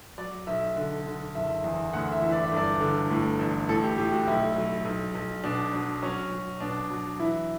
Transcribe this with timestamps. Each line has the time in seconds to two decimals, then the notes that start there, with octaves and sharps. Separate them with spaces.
0.18 F#3 D5
0.47 B1 E5
0.76 D3
1.06 D3
1.35 F#1 E5
1.64 E2
1.93 D2 F#5
2.12 E5
2.22 E3
2.32 D5
2.44 E5
2.52 G1
2.57 D5
2.80 D3
3.10 A2
3.39 A1
3.69 A2 A4
3.84 G4
3.98 A2 G4
4.13 F#4
4.27 B1 E4
4.56 F#3
4.85 B1
5.15 B1
5.44 B2 D4
5.73 F#3 D4
6.02 F#3 C#4
6.32 F#3
6.60 B2 D4
6.91 F#3
7.19 E3 E4